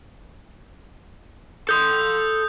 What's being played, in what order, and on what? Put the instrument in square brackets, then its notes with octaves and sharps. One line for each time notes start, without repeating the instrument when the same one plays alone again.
[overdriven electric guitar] A4 C6 [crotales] D#6 G6